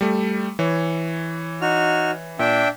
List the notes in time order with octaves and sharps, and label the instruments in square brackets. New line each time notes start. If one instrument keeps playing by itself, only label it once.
[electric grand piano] G3 A3
E3 C#5
[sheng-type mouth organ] D#4 F#4 F6
[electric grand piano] A#2 [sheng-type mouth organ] D4 E5 G5